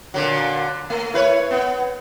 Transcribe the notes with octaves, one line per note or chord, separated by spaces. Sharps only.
A#2 D3 F#3
A3
E4 B4 C#5
B3